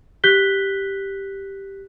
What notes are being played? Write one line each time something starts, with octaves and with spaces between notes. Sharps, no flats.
G4 F#6 G6 B6 G7